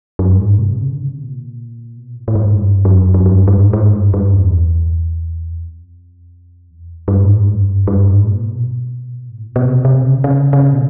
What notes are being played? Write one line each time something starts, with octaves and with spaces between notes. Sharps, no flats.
F#2
G2
G#2
C3
C#3
D3
C3
A#2
B2
A2
A2
G#2
G2
F#2
F#2
F#2
G2
G2
G#2
G#2
G2
G2
E2
F2
E2
F2
G2
A2
G#2
F#2
G2
G2
G#2
A#2
B2
G#2
A2
A#2
B2
C3
C3
C#3
C#3
C#3
B2